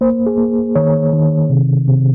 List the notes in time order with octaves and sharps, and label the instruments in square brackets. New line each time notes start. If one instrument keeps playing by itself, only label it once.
[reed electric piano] A#3 C5
G#4
A#3
D#3 C#5
D#3
C3
C3